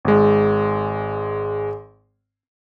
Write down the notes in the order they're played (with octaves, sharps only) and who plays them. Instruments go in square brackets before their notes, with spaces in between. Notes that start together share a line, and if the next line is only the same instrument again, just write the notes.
[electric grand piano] G#1 G#3